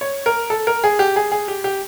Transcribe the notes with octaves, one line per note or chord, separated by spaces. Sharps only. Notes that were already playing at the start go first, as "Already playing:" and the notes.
C#5
A#4
A4
A#4
G#4
G4
G#4
G#4
G4
G4